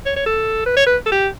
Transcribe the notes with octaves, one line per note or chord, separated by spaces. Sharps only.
C#5
C#5
A4
B4
C#5
B4
A4
G4